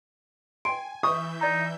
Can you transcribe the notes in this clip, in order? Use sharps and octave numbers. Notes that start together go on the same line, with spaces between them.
G5 G#5 C6 D7
E3 E5 C#6 D#6 G6
D#4 D5 A#5